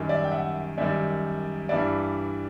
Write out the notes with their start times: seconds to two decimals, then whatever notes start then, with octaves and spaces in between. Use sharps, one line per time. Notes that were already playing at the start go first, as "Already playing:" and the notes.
Already playing: F#2 D#3 G3
0.09 D5 E5
0.24 G5
0.31 E5 F#5
0.78 F#2 D#3 G3 D5 E5
1.69 G2 E3 G3 D5 E5